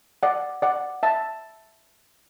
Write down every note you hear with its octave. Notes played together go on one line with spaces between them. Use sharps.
D5 F#5
D5 F#5
E5 A5